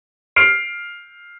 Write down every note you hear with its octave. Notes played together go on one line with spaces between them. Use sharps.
F6 C7 D7